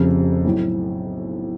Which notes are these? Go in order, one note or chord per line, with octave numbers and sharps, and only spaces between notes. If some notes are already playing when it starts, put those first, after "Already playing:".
Already playing: F1 F2 C#3
B1 A2